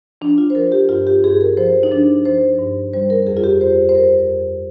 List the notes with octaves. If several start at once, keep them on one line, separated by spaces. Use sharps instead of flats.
F3 D4
F4
C5
F3 A#4
G4
G2 F4
G4
G2 G#4
A#4
F3 C5
D#4
F3 D4
F3 C5
G2
G3 C5
A#4
F2 G#4
F4
G4
F2 C5
C5
F2 A#4
F2